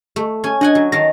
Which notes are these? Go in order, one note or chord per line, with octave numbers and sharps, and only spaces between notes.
A3
C#4 G#5
D4 D#5 F#5 G#5
F#3
D#3 F5 A5 A#6